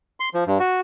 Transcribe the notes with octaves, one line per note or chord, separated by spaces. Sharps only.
C6
F3
G2
F#4